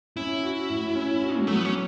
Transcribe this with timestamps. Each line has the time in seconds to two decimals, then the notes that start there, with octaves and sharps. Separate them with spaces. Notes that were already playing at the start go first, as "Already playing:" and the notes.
0.17 C#4 E4
0.43 F#4
0.70 A2
0.95 C#4
1.22 F#4
1.38 G#3
1.47 F#3 A3
1.56 B3
1.65 C#4